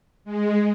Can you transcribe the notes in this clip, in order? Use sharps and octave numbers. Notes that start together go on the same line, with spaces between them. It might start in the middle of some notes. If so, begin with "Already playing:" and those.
G#3